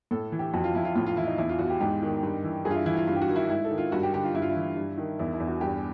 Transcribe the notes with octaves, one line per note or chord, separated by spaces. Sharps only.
A2 A4
E3
G4
F2 F#4
F4
F2 E4
F4
A2 F4
F4
E3 E4
D#4
E2 E4
F4
E2 F#4
G4
G#2 G4
D#3
G2
E3
G2 G#4
F4
E4
E3 E4
F4
G2 F4
G4
F#4
D#3
E4
G#2 E4
A4
D#3
F4
G2 F#4
G4
D3 G4
F4
G2 E4
F4
E4
E3
G2
D#3
E2 E4
E4
E2
F#4
G2 G4